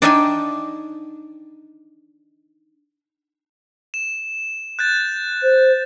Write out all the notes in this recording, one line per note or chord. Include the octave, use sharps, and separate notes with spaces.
D4 D#4 D5 E5 G5 G#5
E7
F#6 G6 A6
C5